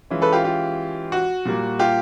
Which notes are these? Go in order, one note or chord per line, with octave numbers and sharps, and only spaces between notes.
E3 G#3 C#4 F4
A4 B4
F4 G4
F4 G4
F#4
A#2 G3 A#3
F4 G4